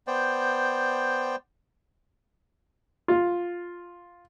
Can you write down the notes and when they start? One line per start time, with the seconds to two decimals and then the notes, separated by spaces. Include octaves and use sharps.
0.07 B3 C5 D5 G5
3.08 F4